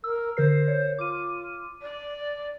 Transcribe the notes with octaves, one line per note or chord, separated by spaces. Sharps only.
A#4 E6
D3 A#4 C5 C7
C#5
F4 D6 D#7
D5